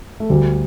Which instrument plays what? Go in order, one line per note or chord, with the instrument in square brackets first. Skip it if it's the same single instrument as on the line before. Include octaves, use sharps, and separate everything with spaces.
[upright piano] A3
[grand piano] D2 [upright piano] G3